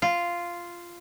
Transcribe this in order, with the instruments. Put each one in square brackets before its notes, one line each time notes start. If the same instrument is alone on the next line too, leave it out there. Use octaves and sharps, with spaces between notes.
[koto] F4